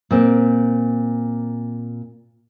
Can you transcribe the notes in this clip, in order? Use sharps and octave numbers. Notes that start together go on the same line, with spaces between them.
A#2 C4